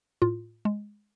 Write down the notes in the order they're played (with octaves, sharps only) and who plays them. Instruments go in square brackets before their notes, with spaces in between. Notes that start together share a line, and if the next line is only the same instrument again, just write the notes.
[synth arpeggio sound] A2 F4
G#3